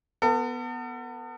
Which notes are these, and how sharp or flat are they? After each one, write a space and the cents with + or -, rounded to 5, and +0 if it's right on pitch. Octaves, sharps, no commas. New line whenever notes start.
B3 +0 A4 +40